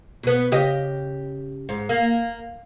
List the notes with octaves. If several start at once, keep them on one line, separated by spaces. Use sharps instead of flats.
B2 B3
C#3 G4 D#5
G#2
A#3